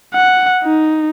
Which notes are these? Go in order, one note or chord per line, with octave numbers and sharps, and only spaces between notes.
F#5
D#4